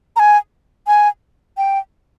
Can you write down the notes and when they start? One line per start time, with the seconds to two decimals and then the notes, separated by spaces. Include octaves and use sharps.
0.16 A#5
0.19 G#5
0.87 G#5
1.57 G5